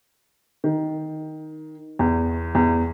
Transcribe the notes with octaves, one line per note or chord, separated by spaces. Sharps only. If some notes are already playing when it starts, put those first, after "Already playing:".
D#3
E2
E2